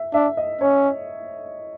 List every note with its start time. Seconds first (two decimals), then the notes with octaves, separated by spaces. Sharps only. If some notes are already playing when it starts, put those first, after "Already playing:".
Already playing: E5
0.14 D4 E5
0.37 D#5
0.61 C#4 C#5